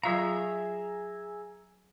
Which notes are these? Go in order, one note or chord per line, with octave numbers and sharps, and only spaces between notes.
F#3 F4 G#4 E5 F5 A#5